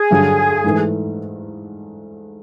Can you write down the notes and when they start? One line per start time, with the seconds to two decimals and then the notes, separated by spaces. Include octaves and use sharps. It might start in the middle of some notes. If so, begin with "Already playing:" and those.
Already playing: G#4
0.11 G2 D3 F#3
0.64 G#2 E3 A3